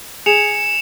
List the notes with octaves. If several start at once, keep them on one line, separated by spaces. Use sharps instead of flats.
G#4 C#7 E7 F7